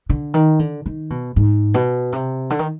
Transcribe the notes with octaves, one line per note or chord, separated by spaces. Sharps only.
D3
D#3
D3
D#3
B2
G#2
B2
C3
D3
D#3